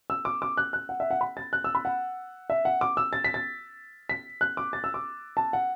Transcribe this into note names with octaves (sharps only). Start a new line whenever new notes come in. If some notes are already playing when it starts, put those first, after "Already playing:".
E6
D6
D6
F#6
F#6
F#5
E5
F#5
B5
A6
F#6
E6
B5
F#5
E5
F#5
D6
E6
A6
B6
A6
B6
F#6
D6
A6
E6
D6
A5
F#5